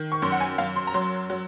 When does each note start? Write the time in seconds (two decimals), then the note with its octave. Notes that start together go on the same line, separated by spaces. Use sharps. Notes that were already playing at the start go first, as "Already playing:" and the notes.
Already playing: D#3
0.12 C#6
0.22 F#2 C6
0.32 F#5
0.40 G#5
0.58 F#2 F5
0.76 C6
0.87 A#5
0.94 F#3 C6
1.30 F#3